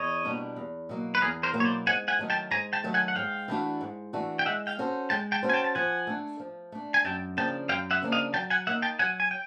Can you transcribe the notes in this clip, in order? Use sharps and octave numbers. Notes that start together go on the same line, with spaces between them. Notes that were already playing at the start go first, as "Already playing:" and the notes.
Already playing: E2 C#5 D#5
B2 G3 A#3 D4
E2
B2 F#3 A#3
B4
E2 G#4 A#4
A#4 C5
B2 F#3 A#3
C#5
C5 D5
G#2 F#5 G#5
F#5 G#5
D#3 F#3 A3
G5 A5
G#2 G#5 A#5
G5 A5
D#3 F#3 A3
F#5 G#5
F#5
G#2 F5 G5
E3 A3 D4 F#4
G#2
E3 A3 D4 F#4
G5
G#3 E5 F#5
F5 G5
C#4 F#4 A4 C5
G#3 G5 A5
G5 A5
C#4 F#4 A4 C5
G#5
G5 A5
A5
F3 F#5 G#5
A3 D4
F3
A3 D4
G#5
F#2 G5 A5
C#3 F3 A#3 D4 G5 A5
F#2 F5 G5
E5 F#5
C#3 F3 A#3 D4
D#5 F5
F#3 G5 A5
F#5 G#5
A#3 D#4 E5 F#5
G5 A5
F#3 F#5 G#5
G#5
G5